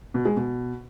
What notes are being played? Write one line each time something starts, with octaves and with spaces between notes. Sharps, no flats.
B2
G#3
B2